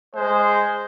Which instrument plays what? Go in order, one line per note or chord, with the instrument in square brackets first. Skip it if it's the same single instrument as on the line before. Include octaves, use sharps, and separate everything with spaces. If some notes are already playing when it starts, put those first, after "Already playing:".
[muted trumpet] G#3 [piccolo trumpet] C5